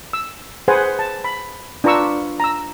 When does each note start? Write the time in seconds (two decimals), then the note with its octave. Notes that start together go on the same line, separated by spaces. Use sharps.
0.13 E6
0.68 G#4 B4 C5 F#5 G#5
0.99 A5
1.24 B5
1.84 D4 F4 B4 A#5 C#6 E6
2.40 A#5 E6